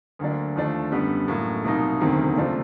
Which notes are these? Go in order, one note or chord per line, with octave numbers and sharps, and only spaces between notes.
D2 D3 F#3 A#3 D4
D#2 D3 F3 A3 D4
F#2 D3 G3 B3
A1 A2 F#3 A#3
C2 B2 F#3 A#3 D#4
E1 D2 C3 D#3 F#3
C#2 C3 F3 A3 D4